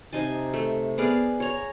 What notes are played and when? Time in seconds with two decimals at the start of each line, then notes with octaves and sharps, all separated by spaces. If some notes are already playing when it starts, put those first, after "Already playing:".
0.13 C3 D#4 G#5 A5
0.54 A3
0.98 B3 G#4 D5 F5
1.40 C#5 A#5